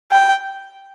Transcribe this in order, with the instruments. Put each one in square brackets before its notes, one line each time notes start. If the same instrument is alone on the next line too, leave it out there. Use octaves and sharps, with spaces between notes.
[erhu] G5